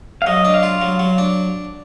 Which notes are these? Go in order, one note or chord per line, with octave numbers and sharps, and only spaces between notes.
F5
F#3 D#5
D4
F5
F4
F#3
F#3
D4